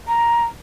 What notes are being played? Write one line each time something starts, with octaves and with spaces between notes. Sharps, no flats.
A#5